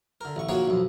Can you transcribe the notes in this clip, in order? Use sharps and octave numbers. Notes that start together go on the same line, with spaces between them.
D3 A#4
A1 C#6
A#1 D#3 A#3 F#4 G#4 C#5
B1 F2